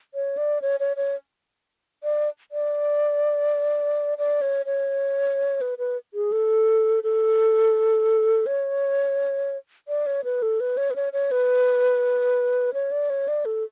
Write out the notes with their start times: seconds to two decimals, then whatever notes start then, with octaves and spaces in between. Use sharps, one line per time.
0.14 C#5
0.37 D5
0.62 C#5
0.80 C#5
0.97 C#5
2.03 D5
2.52 D5
4.18 D5
4.41 C#5
4.66 C#5
5.61 B4
5.78 B4
6.14 G#4
6.32 A4
7.03 A4
8.46 C#5
9.88 D5
10.06 C#5
10.24 B4
10.42 A4
10.60 B4
10.77 C#5
10.90 B4
10.96 C#5
11.13 C#5
11.31 B4
12.74 C#5
12.91 D5
13.10 C#5
13.28 D5
13.45 A4